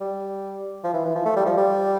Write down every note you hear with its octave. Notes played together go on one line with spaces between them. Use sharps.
G3
F3
E3
E3
F3
A3
G3
F3
G3